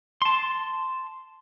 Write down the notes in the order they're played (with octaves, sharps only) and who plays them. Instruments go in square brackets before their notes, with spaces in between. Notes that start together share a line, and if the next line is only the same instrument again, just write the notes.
[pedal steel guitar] A5 C6